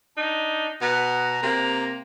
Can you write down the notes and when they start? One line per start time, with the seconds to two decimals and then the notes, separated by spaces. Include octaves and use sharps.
0.17 D4 D#4
0.81 B2 B3 A#5
1.43 C3 A#3